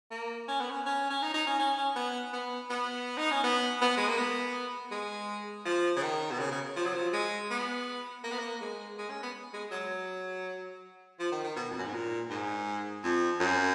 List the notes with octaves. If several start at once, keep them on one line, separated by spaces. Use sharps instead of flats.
A#3
C#4
B3
C#4
C#4
C#4
D#4
D#4
C#4
C#4
C#4
B3
B3
B3
D#4
C#4
B3
B3
G#3
A#3
B3
G#3
F3
C#3
D#3
B2
C#3
C#3
F3
F#3
F3
G#3
B3
A#3
B3
A#3
G#3
G#3
C#4
B3
G#3
F#3
F3
D#3
D#3
B2
F2
F#2
G#2
A#2
G#2
F2
F#2